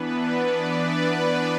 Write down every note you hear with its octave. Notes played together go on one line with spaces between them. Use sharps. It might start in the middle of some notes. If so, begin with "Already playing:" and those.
Already playing: E3 B3 D4 B4
D5
B4